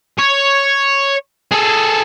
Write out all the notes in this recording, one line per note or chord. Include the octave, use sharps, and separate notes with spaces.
C#5
G#4 A4